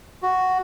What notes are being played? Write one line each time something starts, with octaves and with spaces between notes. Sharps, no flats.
F#4